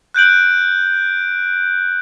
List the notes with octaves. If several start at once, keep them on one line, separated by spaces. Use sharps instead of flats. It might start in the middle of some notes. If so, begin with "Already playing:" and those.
F#6 G6 D7 F#7